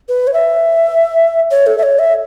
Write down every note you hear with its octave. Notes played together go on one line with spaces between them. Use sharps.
B4
C#5
E5
C#5
A4
E5
C#5
E5